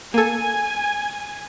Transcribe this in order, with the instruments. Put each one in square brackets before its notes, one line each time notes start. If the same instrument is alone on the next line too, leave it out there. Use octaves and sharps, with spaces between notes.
[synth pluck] A#3 A4 [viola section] G#5